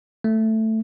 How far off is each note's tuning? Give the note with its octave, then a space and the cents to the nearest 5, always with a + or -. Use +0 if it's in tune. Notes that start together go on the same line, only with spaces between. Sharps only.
A3 +5